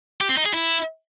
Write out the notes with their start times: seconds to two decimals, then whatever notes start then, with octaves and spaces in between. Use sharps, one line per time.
0.21 G4
0.29 C4
0.37 D#4
0.45 G#4
0.54 E4